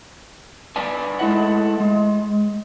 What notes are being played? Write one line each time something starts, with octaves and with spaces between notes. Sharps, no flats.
G2 B4 D5 G#5
G#3 A3 E4 D#5 F#5
G#3